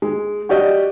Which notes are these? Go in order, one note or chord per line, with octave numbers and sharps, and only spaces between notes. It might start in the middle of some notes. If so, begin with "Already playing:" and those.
G#3
F#4 G4 D5 D#5